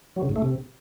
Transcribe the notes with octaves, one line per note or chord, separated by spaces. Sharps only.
F#3
C#3
G#2
A3
C3